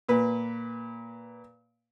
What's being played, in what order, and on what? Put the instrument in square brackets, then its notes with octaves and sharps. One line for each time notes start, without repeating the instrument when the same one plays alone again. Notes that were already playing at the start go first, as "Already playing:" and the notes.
[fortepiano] A#2 B4